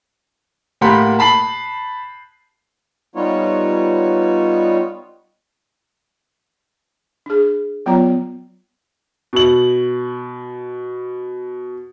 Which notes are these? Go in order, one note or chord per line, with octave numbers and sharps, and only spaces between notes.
A2 A#3 G4 F#5 B5 C6
A5 B5 C7 F#7
G3 B3 D#4 F4 C#5
D4 G#4
F#3 B3 F4 C#5 A#5
B2 F#7